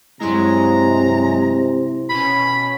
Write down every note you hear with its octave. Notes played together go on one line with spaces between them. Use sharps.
G2 C3 F#3 G#3 E4 A#5 C6
B2 C#4 B5